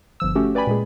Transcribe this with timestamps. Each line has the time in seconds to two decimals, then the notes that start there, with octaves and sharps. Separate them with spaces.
0.20 G1 F3 E6
0.35 A3 C#4 F#4 G4
0.55 B4 D5 G5 G#5 B5
0.67 A#2 G#3 G#4